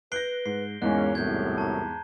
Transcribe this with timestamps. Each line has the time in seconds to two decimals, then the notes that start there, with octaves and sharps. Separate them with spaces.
0.12 B4 F#6 G6 A#6 C7 D7 G7
0.46 G#2 C7
0.82 E2 G#2 G#3 A#3 C#4 D#5 F#6
1.15 C2 F#2 A2 C4 G6 G#6
1.58 A5 A#5